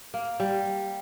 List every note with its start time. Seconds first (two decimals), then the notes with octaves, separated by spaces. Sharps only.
0.14 A#3
0.40 G3